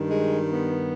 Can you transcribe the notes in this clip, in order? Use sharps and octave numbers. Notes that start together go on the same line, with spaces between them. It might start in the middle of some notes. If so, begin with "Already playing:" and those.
Already playing: G2 D#3
G#3
B3